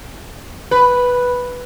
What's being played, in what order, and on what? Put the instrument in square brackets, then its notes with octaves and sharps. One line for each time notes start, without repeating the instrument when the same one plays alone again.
[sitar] B4